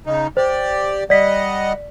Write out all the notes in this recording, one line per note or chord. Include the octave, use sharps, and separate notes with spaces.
C#3 D#4
G4 C5 D5
G3 D5 D#5 F#5 B6